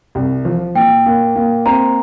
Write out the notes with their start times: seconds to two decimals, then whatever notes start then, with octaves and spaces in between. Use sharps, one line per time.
0.15 C2
0.45 F3
0.75 A#2 G5
1.06 A#3
1.36 A#3
1.66 C4 A#5